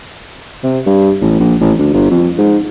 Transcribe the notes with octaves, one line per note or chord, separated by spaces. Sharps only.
C3
G2
A1
A#1
A1
D2
G1
F2
G#2